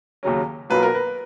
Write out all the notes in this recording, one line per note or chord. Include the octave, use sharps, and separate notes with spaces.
D#2 C#3 F#3 C#4
B1 B2 F#3 A#3 F4 B4
A#4
B4